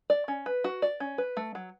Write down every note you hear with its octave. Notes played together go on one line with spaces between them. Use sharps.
D5
C#4
B4
F#4
D5
C#4
B4
A3
F#3